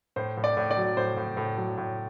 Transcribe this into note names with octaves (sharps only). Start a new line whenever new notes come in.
A2 C5
A2
D5
A2
D5
F#3
A2 C5
A2
A2
F#3
A2